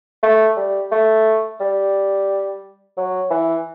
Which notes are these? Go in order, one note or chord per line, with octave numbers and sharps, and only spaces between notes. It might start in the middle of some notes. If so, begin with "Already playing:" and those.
A3
G3
A3
G3
F#3
E3